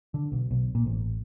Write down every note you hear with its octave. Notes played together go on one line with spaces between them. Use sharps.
D3
B1
B1
A#2
A1